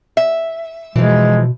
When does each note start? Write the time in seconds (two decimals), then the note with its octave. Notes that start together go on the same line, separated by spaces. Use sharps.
0.17 E5
0.96 B2 E3 F3 G#3